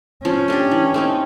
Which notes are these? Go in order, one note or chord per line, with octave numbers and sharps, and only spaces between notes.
F3 C#4
A3 D4 G4
E3
A3 C4 D#4